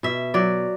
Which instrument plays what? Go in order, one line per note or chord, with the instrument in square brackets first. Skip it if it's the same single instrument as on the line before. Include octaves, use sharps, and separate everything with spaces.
[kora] B2 E5
F#3 D5